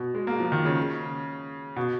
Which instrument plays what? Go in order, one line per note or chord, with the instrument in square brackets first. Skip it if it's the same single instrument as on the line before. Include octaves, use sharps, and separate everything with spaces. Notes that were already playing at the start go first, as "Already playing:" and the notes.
Already playing: [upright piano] B2
G#3
A#3
F3
D#3
C#3
B2